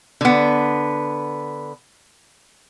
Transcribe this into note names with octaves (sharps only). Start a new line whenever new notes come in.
D3 B3